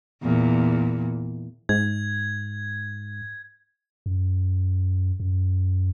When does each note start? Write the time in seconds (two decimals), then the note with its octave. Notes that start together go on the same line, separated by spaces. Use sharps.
0.22 E2 A#2
1.69 G#2 G#6
4.06 F#2
5.20 F#2